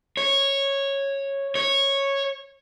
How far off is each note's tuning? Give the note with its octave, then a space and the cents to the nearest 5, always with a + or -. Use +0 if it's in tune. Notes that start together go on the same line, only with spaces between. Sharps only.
C#5 -10
C#5 -10